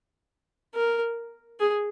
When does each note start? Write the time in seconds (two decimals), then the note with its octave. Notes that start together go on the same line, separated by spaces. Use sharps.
0.75 A#4
1.60 G#4